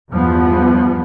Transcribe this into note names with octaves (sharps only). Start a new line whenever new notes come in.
E2 G2 F3 B3